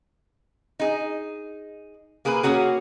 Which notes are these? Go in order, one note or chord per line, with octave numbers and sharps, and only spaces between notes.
D#4 G#4
A#3 G#4 A#4 B4
A#3 C#4 F#4 G#4